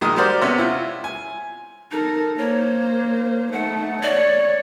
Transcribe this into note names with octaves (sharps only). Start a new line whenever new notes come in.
A#1 D#3 G#3 D#6
F#4 G4 A#4 C5 D5
C3 B3 C#4
E4 F4
G#5
D#4 A4 A#4
A#3 C5 C#5
A3 D#4 F#5
C#5 D5